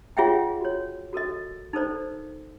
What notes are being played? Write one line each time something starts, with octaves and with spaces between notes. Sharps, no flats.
F4 G#4 C#5 E5 F#5 G5
F#4 C#5
F#4 A4 A#4 D#5
D#4 A4 A#4 C5 D5